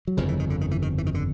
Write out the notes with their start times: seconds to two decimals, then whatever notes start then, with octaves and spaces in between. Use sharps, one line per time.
0.08 F#3
0.17 G1 F2 C#3 F3
0.28 E3
0.39 D#3
0.50 D3
0.61 D#3
0.71 E3
0.82 D#3
0.98 E3
1.06 D#3
1.14 D3